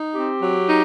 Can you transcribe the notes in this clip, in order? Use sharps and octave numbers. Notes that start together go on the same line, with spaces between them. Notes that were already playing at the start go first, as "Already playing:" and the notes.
Already playing: D#4
C4 G4
F#3
D#4